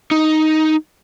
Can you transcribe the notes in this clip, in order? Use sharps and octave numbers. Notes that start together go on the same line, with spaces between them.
D#4